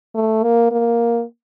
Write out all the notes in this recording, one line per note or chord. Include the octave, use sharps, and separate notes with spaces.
A3
A#3
A#3